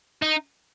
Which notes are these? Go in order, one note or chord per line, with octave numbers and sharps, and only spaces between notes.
D#4